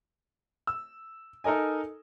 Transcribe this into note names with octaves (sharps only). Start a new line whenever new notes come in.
E6
D#4 A4 A#4 D#5 G#5